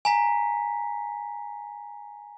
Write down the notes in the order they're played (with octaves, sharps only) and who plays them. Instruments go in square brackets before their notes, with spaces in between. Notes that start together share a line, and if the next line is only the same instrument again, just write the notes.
[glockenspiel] G#5 A#5 B6